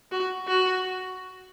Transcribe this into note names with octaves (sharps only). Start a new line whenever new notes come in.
F#4
F#4